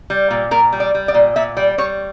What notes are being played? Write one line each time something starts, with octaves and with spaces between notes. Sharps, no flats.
G3
A#2
A#2 A#4
G3
D5
G3
D5
A#2
A#2 E5
G3 D5
G3 C#5